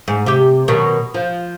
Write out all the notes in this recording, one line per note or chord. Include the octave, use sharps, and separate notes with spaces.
G#2
C3 G4
B2 D#3 F#3
F3